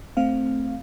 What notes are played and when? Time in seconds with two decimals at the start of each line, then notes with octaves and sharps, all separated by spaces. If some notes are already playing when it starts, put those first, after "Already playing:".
0.17 A3 C4 F5